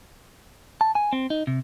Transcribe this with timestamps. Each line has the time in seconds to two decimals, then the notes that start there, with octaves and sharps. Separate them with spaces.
0.81 A5
0.95 G#5
1.13 C4
1.30 D#4
1.47 C3